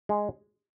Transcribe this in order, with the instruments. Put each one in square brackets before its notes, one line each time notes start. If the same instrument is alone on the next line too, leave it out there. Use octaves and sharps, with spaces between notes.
[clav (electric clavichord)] G#3